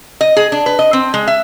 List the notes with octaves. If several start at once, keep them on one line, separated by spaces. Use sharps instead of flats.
D#5
G#4
D4
B4
D#5
C4
G#3
E5